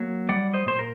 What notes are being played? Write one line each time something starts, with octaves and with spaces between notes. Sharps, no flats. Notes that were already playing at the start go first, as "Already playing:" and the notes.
Already playing: F#3 A#3
G3 D5 F#5
C5 D#5
A#2 C5
A#4